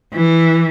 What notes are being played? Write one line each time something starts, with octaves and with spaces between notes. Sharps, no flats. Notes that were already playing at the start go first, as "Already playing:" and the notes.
E3